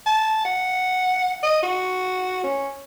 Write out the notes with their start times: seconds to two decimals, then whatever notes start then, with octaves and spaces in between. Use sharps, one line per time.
0.06 A5
0.45 F#5
1.43 D#5
1.63 F#4
2.44 C#4